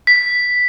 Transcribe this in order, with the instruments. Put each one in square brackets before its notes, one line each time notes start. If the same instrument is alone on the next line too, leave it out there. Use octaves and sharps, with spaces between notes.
[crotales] B6